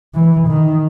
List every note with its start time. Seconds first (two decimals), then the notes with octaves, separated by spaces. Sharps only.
0.14 E3
0.48 D#3